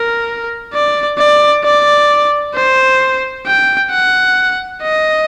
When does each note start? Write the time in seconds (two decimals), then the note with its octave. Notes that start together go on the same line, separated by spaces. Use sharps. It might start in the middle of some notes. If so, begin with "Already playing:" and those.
Already playing: A#4
0.74 D5
1.18 D5
1.64 D5
2.55 C5
3.47 G5
3.91 F#5
4.83 D#5